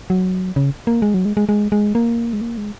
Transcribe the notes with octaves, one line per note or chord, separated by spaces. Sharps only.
F#3
C#3
A#3
G#3
F#3
G#3
G#3
G#3
G#3
A#3
G#3
A#3
G#3